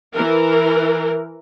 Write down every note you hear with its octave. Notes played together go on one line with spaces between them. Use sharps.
E3 A#4